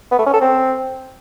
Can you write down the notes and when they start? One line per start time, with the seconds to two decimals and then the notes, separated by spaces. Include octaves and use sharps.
0.11 B3
0.19 A3
0.26 C#4
0.34 A4
0.41 C4